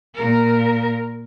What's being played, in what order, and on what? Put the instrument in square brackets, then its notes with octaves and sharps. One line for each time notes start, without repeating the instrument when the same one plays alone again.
[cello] A#2 A#4